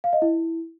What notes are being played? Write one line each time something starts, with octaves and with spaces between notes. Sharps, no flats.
F5
D#5
E4